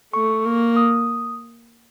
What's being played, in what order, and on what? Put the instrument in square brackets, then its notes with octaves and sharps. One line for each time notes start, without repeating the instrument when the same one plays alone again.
[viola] A3 [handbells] C#6
[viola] A#3
[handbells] D#6